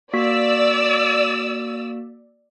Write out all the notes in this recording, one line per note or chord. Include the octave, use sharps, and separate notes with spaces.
A#3 F#4 D5 E6 B6